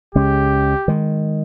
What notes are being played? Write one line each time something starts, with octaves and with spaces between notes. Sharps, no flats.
C#2 C#3 G#3 C#4 G4
D#3 G#3